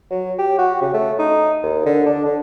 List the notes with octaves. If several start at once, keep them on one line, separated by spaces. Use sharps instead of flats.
F#3
G4
F#4
C#3
A3
D#4
D#2
D3
D4
D3